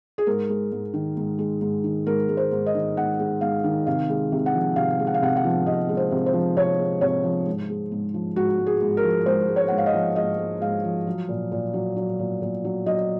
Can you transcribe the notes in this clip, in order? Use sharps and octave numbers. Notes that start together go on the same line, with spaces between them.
G#4
G#2 A#4
G#3
G#2
D#3
G#2
G#3
G#2
D#3
G#2 A#4
G#3
C5
G#2
D#5
D#3
G#2 F#5
G#3
G#2 F5
D#3
C3 F5
G#3
C3
F#5
F3
C3 F5
G#3
F#5
F5
C3 F#5
F#5
F3
C3 D#5
G#3
C5
C3
C5
F3
C3 C#5
G#3
C3 C#5
F3
G#2
G#3
G#2
F3
G#2 F#4
G#3
G#4
G#2
A#4
F3
G#2 C5
G#3
C#5
G#2 F#5
F5
D#5
F3
G#2 D#5
G#3
G#2 F5
F3
F#3
A#2
A#2
F#3
F#3
A#2
A#2
F#3
F#3 D#5